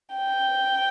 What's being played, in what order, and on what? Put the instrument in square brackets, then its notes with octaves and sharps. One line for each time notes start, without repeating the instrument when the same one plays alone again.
[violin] G5